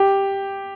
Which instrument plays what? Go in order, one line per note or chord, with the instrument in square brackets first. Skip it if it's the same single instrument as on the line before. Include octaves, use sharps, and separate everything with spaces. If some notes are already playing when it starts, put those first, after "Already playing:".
Already playing: [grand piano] G4